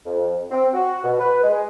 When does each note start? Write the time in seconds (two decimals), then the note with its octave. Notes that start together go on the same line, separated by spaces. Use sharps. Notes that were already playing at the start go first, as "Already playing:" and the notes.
0.06 F2
0.52 C4
0.74 F#4
1.04 B2
1.19 B4
1.44 G#3